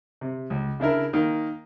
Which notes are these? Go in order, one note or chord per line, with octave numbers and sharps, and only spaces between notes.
C3
C#2
C#3 D4 E4 A#4
D#3 A#3